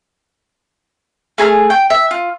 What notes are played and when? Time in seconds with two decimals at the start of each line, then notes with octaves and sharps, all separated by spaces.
1.38 A3 G#4 A#5 F6
1.70 G5
1.90 E5
2.11 F4